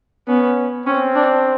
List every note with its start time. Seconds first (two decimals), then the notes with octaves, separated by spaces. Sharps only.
0.28 B3 C#4
0.86 C4 C#4
1.15 D4